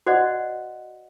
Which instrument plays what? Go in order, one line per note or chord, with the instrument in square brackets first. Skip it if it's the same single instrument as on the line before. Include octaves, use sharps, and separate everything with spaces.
[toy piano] F#4 C5 D5 D#5 F#5